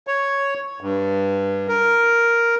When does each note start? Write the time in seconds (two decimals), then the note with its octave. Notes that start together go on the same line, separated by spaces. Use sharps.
0.07 C#5
0.81 G2
1.69 A#4